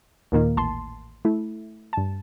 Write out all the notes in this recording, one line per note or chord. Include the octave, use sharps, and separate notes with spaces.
D#2 A#2 D#3 A#3
A1 A5 C6
A3 E4
G2 A5